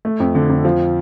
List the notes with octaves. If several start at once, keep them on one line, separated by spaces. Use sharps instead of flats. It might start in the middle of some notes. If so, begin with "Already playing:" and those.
A3
F2
D3
F2
F3